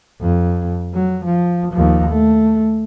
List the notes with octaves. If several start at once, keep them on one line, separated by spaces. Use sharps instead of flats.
F2
F#3
F3
D#2 F3
A3